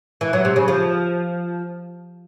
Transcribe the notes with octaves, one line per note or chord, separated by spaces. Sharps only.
E3
F#3
C3
C#3
F3